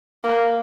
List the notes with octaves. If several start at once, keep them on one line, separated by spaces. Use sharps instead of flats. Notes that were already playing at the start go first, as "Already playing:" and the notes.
A#3